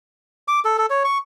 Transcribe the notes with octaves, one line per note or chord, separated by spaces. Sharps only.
D6
A4
A4
C#5
C#6